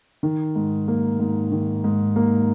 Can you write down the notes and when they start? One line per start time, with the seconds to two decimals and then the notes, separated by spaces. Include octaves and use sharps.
0.23 D#3
0.56 G#2
0.88 A#3
1.20 G#2
1.51 D#3
1.84 G#2
2.16 A#3